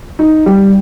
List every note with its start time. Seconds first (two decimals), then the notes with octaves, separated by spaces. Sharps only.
0.19 D#4
0.46 G3